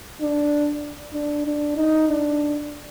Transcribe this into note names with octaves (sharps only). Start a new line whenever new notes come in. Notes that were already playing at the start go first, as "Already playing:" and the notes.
D4
D4
D4
D#4
D4